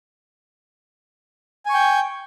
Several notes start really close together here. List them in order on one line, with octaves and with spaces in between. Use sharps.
G#5 C#6 G5